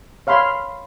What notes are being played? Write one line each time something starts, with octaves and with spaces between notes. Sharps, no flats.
C#5 F5 B5 C6